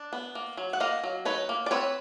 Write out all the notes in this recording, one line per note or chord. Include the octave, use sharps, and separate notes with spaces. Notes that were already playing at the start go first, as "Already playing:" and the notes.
Already playing: D4
B3
A#3
F#3
F#5
A#3 D#5 F5
F#3
D#4 B4 C#5
A#3
D5
C4 B4 C#5